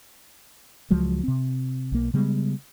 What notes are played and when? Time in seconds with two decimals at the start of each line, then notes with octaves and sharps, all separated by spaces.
0.90 C#2 F3 F#3 G#3
1.23 C3 C4
1.92 B1 A#3
2.14 C#3 G3 G#3 B3